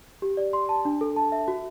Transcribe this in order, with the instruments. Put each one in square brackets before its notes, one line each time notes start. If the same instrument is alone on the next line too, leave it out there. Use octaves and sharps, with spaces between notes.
[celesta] G4
D5
C6
A5
D4
A4
A5
E5
F#4